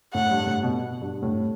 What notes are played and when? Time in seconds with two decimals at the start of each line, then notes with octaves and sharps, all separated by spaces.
0.15 A2 F#5
0.31 G2
0.46 A2
0.63 B2
1.01 G2
1.22 A2